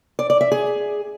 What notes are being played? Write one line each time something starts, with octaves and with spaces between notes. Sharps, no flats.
D5
D5
E5
G#4